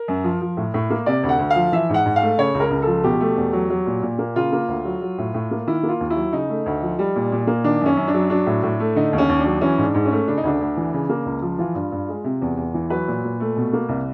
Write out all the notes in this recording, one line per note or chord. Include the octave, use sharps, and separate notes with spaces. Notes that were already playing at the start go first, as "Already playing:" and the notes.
Already playing: A#4
F#2
F3
F3
A2
A2
A#3
C3 D5
D2
F#5
D2
F5
F3
E3 E5
G#2 F#5
G#2
F5
A3
C#3 C#5
C#2
A#4
C#2
F3 A4
B2 G4
A3
E2
F#3
F#3
A#2
A#2
A#3
C#3 F4
A#3
D2
F#3
F#3
A2
A2
A#3
D#3 E4
A#3
F4
D#2
E4
F#3
C#3 D#4
A3
D2
F3
G3
A#2
A#2
A#3
D#3 D4
F#2 C#4
F#2
D4
F#3
F#3 D4
A2
A2
A3
D3 D#4
D#2
C#4
D#2
D4
F#3
E3 C#4
G#2 D4
G#2
C#4
A3
C#3 D4
D#4
D2 D4
D2
E3
C#3
A#3
C#2
F3
E3 F4
G2
G2
G#3
C3
E2
E2
E3
F#3 B4
A#2
A#2
A3
B2
A#3
C2